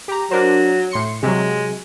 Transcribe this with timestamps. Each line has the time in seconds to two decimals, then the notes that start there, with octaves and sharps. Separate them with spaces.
0.08 G4 A#5
0.31 F#3 D4 A#4 C5
0.91 A2 C6 C#7
1.23 C3 F#3 G#3